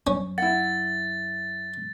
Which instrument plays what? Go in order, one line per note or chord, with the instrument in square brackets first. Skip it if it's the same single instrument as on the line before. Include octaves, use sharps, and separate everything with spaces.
[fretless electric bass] F#2 [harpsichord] C#4
[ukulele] E4 F#5 [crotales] A6